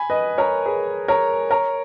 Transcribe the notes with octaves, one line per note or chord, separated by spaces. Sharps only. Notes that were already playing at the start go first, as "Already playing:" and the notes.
Already playing: G#5 B5
B4 D#5
A#4 C#5
G#4 B4
A#4 C#5
A#4 C#5